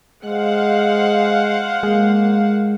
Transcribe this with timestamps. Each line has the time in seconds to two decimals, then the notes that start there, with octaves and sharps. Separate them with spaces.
0.25 G#3 C5 F5 F#5
1.83 G#3 A#3